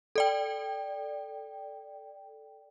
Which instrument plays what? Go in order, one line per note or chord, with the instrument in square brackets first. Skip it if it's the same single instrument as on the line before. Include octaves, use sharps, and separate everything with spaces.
[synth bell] A4 D5 G5